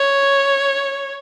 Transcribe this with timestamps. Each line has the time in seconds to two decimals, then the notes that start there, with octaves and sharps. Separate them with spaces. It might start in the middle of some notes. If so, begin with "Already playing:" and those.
Already playing: C#5